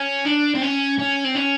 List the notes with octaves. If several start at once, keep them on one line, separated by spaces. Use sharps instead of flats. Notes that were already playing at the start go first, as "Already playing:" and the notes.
Already playing: C#4
D4
C4
C#4
C#4
C4
C#4